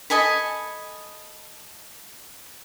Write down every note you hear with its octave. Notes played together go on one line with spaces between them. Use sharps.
A4 D#5 G#5 B5